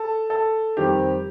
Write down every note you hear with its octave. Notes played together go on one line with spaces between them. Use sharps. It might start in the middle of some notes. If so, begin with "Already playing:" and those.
Already playing: A4
A4
F2 D#3 G3 C4 G4